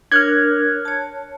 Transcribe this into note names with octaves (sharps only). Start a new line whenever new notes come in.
D4 A#4 C#5 F6 F#6 G#6
C#5 A5